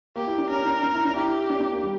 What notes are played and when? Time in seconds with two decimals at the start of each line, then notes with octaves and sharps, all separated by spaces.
0.16 A#3 G4
0.27 E4
0.38 D4
0.49 C#4 A#4
0.62 C#4
0.65 D4
0.83 D4
0.94 E4
1.05 D4
1.16 E4 G4
1.50 D4
1.60 D4
1.72 A#3
1.83 G3